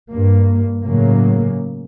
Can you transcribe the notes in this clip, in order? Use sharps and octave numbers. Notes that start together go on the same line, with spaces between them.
G2 A#3
A2 C#3 F#3 A#3